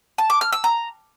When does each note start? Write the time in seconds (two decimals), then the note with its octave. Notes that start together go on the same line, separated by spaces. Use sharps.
0.18 A5
0.30 D6
0.41 F6
0.53 E6
0.64 A#5